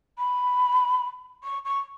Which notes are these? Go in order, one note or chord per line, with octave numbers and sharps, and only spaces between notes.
B5
C#6
C#6